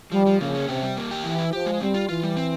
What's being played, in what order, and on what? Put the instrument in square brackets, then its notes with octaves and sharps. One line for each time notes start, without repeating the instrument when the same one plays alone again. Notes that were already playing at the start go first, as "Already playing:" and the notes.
[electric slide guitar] F3 [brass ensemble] G3
[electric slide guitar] F3
[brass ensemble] C#3 [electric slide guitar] A#3
[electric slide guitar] C#4
[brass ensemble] C3 [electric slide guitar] G4
[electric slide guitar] G3
A#3
G4
[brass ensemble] E3 [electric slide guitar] E4
[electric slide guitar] E4
[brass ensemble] F3 [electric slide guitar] G4
[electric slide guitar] G#3
[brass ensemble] G3 [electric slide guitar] C4
[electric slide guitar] F4
[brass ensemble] E3 [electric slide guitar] F4
[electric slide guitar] G3
C4